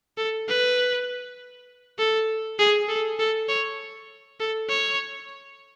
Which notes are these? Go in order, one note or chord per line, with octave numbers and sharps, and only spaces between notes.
A4
B4
A4
G#4
A4
A4
C#5
A4
C#5